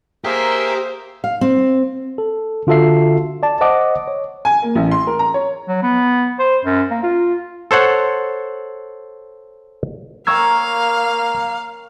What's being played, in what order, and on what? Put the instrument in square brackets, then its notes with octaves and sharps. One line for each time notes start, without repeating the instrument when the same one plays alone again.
[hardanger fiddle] A#3 [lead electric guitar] G4 [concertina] G#4 A#4 E5 [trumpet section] C5
[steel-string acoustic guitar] F5
C4
[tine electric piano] A4
D3 F4 F#4 A4 E5 C7
D5 A5
C5 D#5 F#5 D6
C#5
[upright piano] G#5
A#3
A1
C6
A#4
A#5
C#5
[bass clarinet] F#3
B3
C5
F#2
A#3
F4
[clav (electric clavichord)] A4 C5 C#5 F#5
[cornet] A#3 [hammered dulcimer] A#4 C#5 G5 [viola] F5 [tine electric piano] C#6 E6 G#6